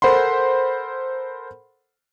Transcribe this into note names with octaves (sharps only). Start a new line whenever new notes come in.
A4 A#4 C5 F#5 B5 C6